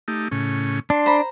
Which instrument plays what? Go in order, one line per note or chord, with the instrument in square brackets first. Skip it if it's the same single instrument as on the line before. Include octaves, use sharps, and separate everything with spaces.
[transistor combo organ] A3 D#4 G4
A2 C#3 C#4
[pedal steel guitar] D4 [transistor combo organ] C6
[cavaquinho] C5 A#5 B5